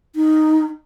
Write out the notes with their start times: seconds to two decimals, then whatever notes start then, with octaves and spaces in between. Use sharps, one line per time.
0.16 D#4